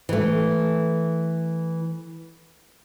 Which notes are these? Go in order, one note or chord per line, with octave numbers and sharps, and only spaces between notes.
E3 A3